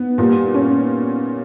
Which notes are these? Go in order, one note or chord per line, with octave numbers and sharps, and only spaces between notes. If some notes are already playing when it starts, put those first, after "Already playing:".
Already playing: B3
A#2 G3
C#4